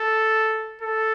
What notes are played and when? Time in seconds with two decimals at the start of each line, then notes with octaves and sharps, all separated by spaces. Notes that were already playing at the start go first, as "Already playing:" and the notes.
Already playing: A4
0.81 A4